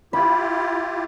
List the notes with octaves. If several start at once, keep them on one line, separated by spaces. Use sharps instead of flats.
E4 F4 G4 B5